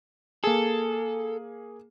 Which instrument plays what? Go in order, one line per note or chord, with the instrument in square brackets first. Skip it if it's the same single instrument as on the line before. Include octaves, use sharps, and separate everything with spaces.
[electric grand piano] A#3 G#4 [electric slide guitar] A4